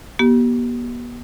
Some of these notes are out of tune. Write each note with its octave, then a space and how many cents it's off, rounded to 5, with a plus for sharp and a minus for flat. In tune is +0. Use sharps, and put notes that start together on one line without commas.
B3 -40 G4 -25